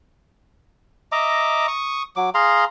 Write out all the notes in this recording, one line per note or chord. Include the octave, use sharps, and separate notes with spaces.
D#5 E5 A#5 D6
C#6 D#6
F#3 D6
G#4 F5 A#5 C6